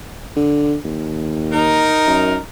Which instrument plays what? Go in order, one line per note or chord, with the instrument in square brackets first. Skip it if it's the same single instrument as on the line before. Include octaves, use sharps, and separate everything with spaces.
[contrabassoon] D3
D#2
[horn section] D#4 A#4
[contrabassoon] F#2